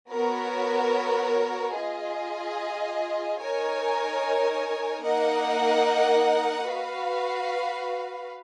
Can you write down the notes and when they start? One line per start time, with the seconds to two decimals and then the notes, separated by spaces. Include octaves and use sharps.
0.11 B3 F#4 A#4 C#5
1.76 F4 G#4 D#5
3.39 D#4 A#4 C#5 G#5
5.03 A#3 D#4 A#4 D#5 F#5
6.67 F#4 B4 F5